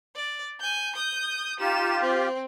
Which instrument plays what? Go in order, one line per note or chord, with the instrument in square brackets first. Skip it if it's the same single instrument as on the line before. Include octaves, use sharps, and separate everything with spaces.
[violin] D5
G#5 G6
D#6 G6
[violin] D#4 E7 [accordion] F4 G4
[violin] C4